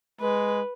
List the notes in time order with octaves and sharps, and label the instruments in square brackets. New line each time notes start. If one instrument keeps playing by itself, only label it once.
[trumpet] G#3 [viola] B4